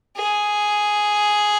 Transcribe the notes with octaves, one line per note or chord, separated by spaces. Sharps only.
G#4